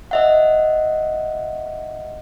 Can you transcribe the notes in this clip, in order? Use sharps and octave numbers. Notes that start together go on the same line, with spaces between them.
D#5 E5 F#5